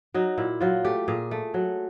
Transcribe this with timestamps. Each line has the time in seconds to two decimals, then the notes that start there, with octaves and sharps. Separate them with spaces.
0.14 F#3 D#4
0.38 A#2 E4
0.61 F#3 F4
0.84 A3 G4
1.08 A#2 G#4
1.31 A3
1.54 F#3